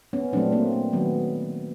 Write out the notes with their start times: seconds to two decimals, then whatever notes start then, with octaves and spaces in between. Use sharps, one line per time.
0.13 B3 C#4
0.33 A#2 F#3 A3 C4 D4
0.52 A#3 C4
0.72 A#3
0.92 D#3 F#3 A3 B3